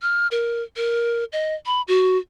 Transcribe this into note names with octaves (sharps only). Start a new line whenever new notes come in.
F6
A#4
A#4
D#5
B5
F#4